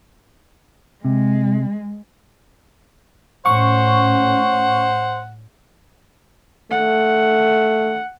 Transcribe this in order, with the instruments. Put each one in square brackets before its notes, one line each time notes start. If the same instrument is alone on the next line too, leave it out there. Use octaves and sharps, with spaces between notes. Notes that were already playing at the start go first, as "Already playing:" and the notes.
[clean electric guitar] C3 [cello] G#3
[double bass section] A2 C#4 [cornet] C5 [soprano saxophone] F#5 [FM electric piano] C#6
[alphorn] A3 [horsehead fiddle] F#5